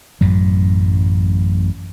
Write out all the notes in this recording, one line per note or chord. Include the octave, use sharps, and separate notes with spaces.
A1 F#2 A2 F#3